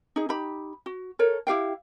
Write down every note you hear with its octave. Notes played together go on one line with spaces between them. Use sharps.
D#4 G#4
D#4 G4 B5
F#4
A4 A#4 C#5
E4 G4 F5 G5